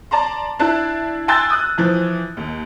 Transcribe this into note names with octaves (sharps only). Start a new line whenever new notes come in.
D5 A5 A#5 C6
D4 E4 A5 F#6
G5 G#5 C6 E6 F#6 A6
D#6 F#6
E3 F3
D#2